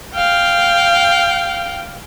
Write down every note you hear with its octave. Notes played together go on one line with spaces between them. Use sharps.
F5 G5